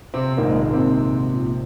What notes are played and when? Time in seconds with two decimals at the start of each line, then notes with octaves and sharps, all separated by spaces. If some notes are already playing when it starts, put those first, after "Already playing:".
0.14 C3 C4
0.37 A#1 G#2 D#3 A#3
0.50 G#3
0.61 A#3
0.74 C3 C4
1.33 A#1 A#2 F3